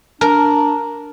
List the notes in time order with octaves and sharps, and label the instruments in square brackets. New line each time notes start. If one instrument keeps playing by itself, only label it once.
[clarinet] D4 [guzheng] A#4